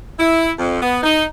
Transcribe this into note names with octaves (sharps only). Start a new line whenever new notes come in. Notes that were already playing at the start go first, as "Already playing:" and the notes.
E4
F2
B3
D#4